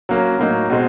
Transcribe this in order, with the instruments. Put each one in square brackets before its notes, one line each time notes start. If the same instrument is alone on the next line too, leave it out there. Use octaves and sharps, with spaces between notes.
[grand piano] F#3 A#3 C#4
A2 F#3 A#3 D#4
B2 G#3 C4